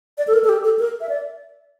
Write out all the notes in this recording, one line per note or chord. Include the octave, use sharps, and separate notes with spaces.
D5
A4
A#4
A4
G4
A4
A#4
E5
D5